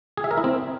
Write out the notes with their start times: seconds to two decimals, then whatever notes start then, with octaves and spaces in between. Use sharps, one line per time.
0.17 G#4
0.24 E5
0.31 A#4
0.37 E4
0.44 C4